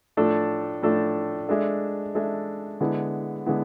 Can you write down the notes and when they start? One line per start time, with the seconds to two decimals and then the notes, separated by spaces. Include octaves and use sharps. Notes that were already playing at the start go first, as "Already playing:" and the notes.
0.17 A2 F3 A3 D4 A4
0.82 A2 F3 A3 D4 A4
1.49 G#3 D4 A4 E5
2.15 G#3 D4 A4 E5
2.81 D3 G#3 B3 E4
3.46 D3 G#3 B3 E4